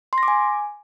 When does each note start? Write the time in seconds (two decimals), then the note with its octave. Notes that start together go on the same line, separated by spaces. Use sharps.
0.13 C6
0.18 A#6
0.23 D6
0.28 G#5